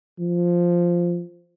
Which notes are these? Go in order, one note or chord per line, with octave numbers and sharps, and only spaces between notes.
F3